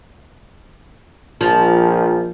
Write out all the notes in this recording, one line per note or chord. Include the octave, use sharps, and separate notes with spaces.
A#1 F3